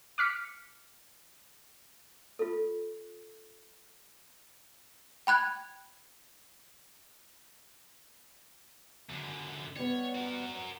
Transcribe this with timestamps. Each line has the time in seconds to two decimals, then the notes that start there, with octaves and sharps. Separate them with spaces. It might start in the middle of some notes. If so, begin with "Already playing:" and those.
0.18 D6 F6 B6 C#7
2.39 F4 A4
5.27 G5 B5 F#6 G#6
9.10 F#2 D3
9.76 G3 B3 C#5
10.15 F#4 A#4